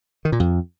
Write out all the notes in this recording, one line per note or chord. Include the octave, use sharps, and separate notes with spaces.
D#3
A#2
F2